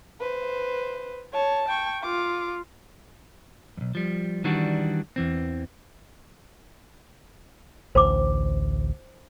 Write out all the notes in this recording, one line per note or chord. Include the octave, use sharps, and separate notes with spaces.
B4 C5
C#5 A5
G5 C#6
F4 D6
B1 F2
F3 G3
D#3 E3 G3 D4 F#4
E2 E3 C4
A1 D2 C5 D6